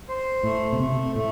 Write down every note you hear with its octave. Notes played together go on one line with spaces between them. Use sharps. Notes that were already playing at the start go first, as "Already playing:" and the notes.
C5
A2 A3
B2
C3 A3
A2 A3